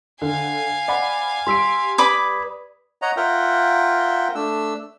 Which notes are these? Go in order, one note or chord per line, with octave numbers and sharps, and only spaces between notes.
D3 F5 G#5
D5 F#5 B5
G3 C6 E6 B6 D7
B4 D5 B5 D6 D#6 G#6
C#5 D#5 F#5 A#5
F4 A#4 E5 F#5 G5
A3 D4 E6